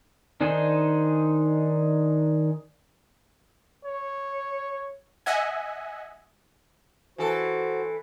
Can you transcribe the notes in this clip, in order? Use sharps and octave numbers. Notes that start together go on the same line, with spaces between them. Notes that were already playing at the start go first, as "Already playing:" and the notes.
D#3 D4 D#4 G#4 C5
C#5
D#5 E5 F#5 G#5
E3 F#4 A4 C5